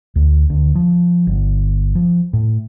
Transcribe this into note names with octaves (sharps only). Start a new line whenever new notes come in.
D2
D2
F3
G1
F3
A2